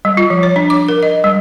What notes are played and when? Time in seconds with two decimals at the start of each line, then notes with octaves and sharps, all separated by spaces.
0.05 G3
0.17 F4
0.30 F3
0.43 C#5
0.56 D4
0.70 D6
0.89 A#4
1.03 D#5
1.24 G3